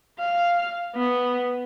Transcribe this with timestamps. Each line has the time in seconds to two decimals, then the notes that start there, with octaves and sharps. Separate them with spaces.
0.19 F5
0.96 B3